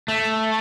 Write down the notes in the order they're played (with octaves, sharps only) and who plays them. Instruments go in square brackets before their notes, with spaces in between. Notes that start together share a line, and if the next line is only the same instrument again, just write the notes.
[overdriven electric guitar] A3